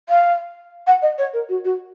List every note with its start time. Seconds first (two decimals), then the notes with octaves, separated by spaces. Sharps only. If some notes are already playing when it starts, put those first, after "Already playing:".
0.09 F5
0.87 F#5
1.02 D#5
1.18 C#5
1.33 A#4
1.49 F#4
1.64 F#4